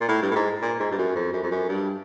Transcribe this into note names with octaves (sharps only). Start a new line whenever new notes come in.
A#2
A2
G2
A2
G#2
A#2
G#2
G2
F#2
F2
F#2
F2
F#2
G2